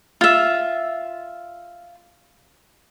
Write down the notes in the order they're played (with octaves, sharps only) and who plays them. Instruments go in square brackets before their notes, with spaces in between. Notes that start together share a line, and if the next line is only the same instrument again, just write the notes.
[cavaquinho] F4 E5